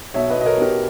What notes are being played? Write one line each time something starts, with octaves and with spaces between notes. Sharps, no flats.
B1 C#5 E5
B4 D#5
B2
D#5
A#4 C#5
B1
G4 A#4